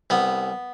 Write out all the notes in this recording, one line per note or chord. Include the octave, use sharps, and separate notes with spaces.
C2 B3